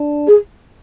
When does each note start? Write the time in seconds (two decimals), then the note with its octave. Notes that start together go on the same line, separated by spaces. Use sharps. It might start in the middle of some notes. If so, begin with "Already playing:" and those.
Already playing: D4
0.27 G#4